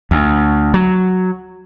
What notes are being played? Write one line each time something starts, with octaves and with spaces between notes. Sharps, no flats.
D2
F#3